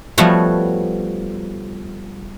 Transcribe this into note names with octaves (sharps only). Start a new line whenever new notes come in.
F3 G3 A3 B3 F#4 C#5